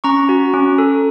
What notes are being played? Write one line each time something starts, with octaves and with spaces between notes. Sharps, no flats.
C#4 A#5 C#6
F#4
C#4
A4